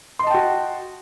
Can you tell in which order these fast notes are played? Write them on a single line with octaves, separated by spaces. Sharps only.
C6 D#5 A5 G5 F#4